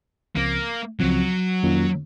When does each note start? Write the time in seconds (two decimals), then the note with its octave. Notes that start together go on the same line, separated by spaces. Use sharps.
0.36 C#2 C#3 F3 A#3 C4
1.00 C#2 C#3 F3 F#3 C4
1.63 F2 D#3 A#3 C#4 F4